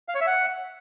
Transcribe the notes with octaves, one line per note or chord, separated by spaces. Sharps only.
F5
C#5
E5
F#5